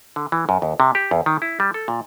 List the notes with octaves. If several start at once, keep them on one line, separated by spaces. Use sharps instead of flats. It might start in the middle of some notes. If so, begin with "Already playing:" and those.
D3
E3
F#2
D#2
C3
G4
E2
D#3
E4
G3
A4
A#2